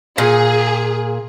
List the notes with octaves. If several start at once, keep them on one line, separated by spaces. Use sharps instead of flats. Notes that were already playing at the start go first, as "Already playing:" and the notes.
A#2 G#4